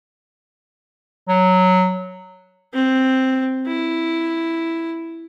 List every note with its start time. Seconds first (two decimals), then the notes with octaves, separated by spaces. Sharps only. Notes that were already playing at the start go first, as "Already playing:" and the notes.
1.28 F#3
2.73 C4
3.66 E4